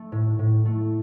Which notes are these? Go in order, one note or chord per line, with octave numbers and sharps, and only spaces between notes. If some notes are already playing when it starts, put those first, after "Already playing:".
Already playing: A3
A2
A2
A3